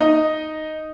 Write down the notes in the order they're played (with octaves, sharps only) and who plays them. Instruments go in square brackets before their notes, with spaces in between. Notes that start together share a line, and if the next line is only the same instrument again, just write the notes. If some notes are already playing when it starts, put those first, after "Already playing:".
[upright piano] D#4 D#5